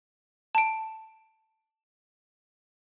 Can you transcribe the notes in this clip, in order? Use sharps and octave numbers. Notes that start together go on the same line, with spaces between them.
A5 D7